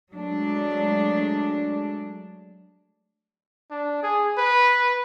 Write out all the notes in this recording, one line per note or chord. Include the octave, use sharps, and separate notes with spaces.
F#3 G#3 A3 D4
D4
G#4
B4